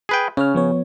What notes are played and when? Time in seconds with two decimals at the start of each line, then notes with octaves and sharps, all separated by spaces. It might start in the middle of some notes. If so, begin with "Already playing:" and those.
0.09 G#4 B4 G5
0.37 C#3 C#4 C#5 F6
0.55 F3 B3 C#5